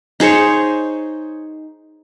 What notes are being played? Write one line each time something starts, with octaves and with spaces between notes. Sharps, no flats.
D#4 G#4 C5 C#5